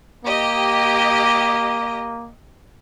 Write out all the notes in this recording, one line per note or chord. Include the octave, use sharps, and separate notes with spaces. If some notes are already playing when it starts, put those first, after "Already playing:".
A#3 G4 D#5